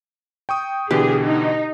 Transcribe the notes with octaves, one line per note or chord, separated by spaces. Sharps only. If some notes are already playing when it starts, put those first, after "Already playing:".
G5 C#6 D#6
B2 D3 E3 G4 G#4
D#4